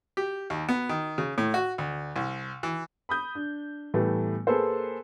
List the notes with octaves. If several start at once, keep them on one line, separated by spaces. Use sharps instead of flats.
G4
D#2
B3
D#3
C#3
A2
F#4
D2
C2
E3
B5 D#6 G6
D4
A2 E3 G3 A3 B3
A#3 G#4 A4 B4 C5